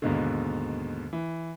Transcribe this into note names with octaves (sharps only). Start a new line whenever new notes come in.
D#2 G#2 B2 D3
E3